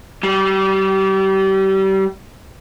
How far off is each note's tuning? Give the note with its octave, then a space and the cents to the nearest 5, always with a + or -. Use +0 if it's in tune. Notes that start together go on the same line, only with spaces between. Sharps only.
G3 -30